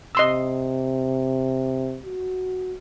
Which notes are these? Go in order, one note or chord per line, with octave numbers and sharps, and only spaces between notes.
C3 D#5 C6 E6
F#4